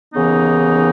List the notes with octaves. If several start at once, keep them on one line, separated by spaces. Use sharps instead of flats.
D#2 C#3 E3 B3 D#4